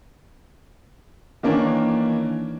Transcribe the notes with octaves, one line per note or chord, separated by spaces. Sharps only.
D#3 E3 A#3 C#4 D4